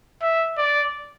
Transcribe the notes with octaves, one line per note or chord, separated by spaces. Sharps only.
E5
D5